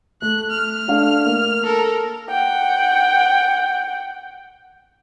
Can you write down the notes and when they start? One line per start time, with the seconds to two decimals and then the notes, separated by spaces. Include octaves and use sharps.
0.22 A3 F#6
0.51 F6
0.88 A3 D4 F5
1.26 A#3
1.64 A4 A#4
2.29 F#5 G5